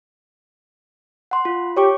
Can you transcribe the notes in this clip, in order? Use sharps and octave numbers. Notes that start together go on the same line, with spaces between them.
F#5 C6
F4
G4 C#5 C#6 D6